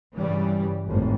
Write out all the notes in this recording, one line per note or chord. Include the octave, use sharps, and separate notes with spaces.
G2 C#3 E3 G3
G#1 F2 A2